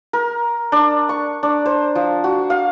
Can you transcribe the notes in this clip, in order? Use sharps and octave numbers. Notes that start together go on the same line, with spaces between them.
A#4
D4
C#6
D4
C5
F3
F#4
F5